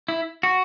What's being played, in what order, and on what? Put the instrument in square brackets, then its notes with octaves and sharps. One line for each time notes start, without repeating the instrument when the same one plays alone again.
[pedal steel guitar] E4
F#4